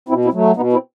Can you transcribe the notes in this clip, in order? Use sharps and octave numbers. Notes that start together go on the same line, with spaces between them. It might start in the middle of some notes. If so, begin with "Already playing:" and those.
B2 C4 E4
C4 E4
F#3 A3
B2 B3 D#4
C4 E4